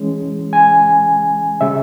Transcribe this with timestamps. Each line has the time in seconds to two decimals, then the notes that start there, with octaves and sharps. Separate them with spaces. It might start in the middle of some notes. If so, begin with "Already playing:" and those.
Already playing: E3 G#3 C#4
0.53 G#5
1.61 C#3 G#3 C#4 E5